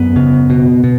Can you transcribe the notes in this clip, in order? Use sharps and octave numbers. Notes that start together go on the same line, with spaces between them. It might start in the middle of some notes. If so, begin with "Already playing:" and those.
Already playing: F#2 B3
C#3
B2
B2